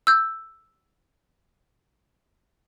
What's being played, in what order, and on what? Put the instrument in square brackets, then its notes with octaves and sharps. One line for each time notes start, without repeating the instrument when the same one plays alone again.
[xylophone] E6 G6